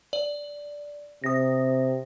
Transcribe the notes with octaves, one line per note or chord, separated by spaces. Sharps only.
D5
C3 D#6 A#6